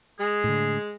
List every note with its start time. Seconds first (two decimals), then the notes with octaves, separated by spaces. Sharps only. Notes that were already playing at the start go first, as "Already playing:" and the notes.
0.20 G#3 G#4
0.44 A2 D3